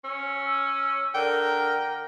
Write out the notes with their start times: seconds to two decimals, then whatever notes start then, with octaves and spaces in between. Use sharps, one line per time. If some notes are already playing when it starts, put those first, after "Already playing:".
0.04 C#4 E6
1.14 D3 A#4 G5